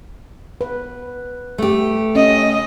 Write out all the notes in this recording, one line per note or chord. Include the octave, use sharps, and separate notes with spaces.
B4
A3 G4
C#4 D#5